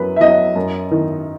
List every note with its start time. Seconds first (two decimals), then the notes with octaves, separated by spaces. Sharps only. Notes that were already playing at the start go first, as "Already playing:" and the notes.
Already playing: F#2 F#3 B4
0.16 E5
0.20 F#3 D#5
0.56 F#2
0.91 D#3